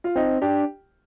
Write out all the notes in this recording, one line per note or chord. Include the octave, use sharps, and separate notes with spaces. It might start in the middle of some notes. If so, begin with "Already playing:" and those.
F4
C4 D#4
D4 G4